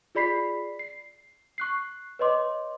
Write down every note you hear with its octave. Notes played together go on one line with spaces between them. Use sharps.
F4 G#4 D5 B5 B6 C7
C7
C#6 F#6 C7
B4 C#5 D#5 C6 D6